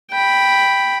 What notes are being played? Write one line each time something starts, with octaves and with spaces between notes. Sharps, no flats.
G5 B5